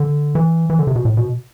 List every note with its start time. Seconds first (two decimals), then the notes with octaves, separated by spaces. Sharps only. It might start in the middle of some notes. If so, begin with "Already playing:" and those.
Already playing: D3
0.35 E3
0.70 E3
0.79 D3
0.87 C3
0.96 B2
1.05 A2
1.17 B2